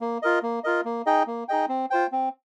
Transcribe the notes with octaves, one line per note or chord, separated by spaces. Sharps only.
A#3
F4 A#4 D#5
A#3
F4 A#4 D#5
A#3
D#4 G#4 D#5 G5
A#3
D#4 G#4 D#5 G5
C4
F4 C5 G5
C4